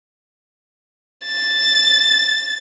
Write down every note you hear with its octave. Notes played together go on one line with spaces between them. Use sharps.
A6